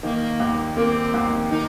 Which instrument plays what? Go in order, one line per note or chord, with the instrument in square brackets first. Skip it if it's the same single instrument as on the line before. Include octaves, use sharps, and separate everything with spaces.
[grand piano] D#3 [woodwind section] A#3
[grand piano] D#2
[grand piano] A#3 [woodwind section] C4
[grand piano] D#2
[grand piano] D#3 [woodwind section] D#4